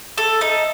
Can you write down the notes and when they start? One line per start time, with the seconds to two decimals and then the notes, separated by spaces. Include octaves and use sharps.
0.18 A4
0.41 D#4